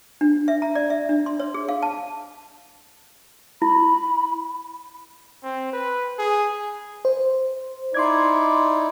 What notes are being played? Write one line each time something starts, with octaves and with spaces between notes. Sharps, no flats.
D4
E5
A#5
D5
E5
D4
C6
C#5
G#4
F5
A5
E4 B5
C4
B4
G#4
C5
D#4 E4 D5 C6 D6 G#6